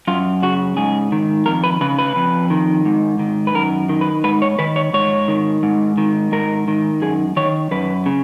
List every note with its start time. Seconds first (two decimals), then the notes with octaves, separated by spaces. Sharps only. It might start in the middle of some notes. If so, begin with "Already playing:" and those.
0.07 F#2 F4
0.43 C#3 F#4
0.77 G#2 G#4
1.12 D#3
1.46 F2 A#4
1.64 B4
1.81 C#3 B4
1.99 B4
2.16 F2
2.50 D#3
2.85 G#2
3.19 D#3
3.47 B4
3.55 F#2 A#4
3.89 D#3
4.01 B4
4.24 G#2 B4
4.42 C#5
4.59 D#3 B4
4.76 C#5
4.93 G#2 C#5
5.28 D#3
5.63 G#2
5.98 D#3
6.32 G#2 A#4
6.68 D#3
7.02 F#2 G#4
7.36 D#3 C#5
7.71 F#2 B4
8.06 C#3